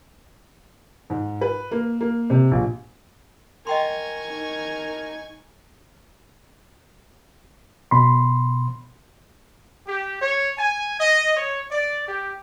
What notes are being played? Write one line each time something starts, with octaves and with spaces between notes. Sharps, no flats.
G#2
B4
A#3
A#3
C3
A#1
A#4 D#5 G5 G#5 C6 C#6
D#4
B2 B5 C6
G4
C#5
G#5
D#5
C#5
D5
G4